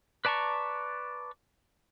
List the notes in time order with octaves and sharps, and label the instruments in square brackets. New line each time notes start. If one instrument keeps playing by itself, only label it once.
[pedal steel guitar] B4 D5 A5 A#5 C#6